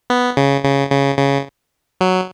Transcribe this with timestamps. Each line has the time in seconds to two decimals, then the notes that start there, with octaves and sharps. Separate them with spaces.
0.10 B3
0.37 C#3
0.64 C#3
0.92 C#3
1.19 C#3
2.01 F#3